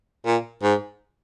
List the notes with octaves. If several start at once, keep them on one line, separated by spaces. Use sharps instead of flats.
A#2
G#2